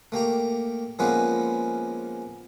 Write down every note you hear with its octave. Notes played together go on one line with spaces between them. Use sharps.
A3 A#3 G4 A#5
F3 G#3 A#3 B3 C#4 B4